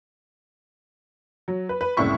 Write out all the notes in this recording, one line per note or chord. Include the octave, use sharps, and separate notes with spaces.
F#3
B4
B4
F#1 C2 A2 E4 C#6 B6